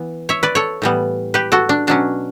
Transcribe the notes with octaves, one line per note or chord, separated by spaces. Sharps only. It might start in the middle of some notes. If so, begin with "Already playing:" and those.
Already playing: E3 B3
C#5 E5
B4 D5
A4 C#5
A2 E3 G3 B3
G4 B4
F#4 A4
D4
B2 F#3 C#4 D4